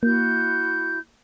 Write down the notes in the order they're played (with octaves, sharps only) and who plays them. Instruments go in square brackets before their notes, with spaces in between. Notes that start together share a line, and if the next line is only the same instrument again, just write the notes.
[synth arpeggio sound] A#3 [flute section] E4 F#4 G6